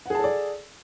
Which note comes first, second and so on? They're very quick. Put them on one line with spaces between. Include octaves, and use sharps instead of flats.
F#5 G#4 A5 A4 D5